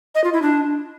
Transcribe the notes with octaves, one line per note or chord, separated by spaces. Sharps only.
D#5
F4
E4
D4